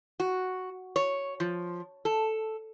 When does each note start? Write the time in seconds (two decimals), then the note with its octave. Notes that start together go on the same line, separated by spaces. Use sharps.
0.20 F#4
0.96 C#5
1.40 F3
2.05 A4